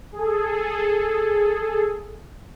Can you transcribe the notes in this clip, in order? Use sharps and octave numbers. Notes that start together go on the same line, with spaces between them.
G#4 A4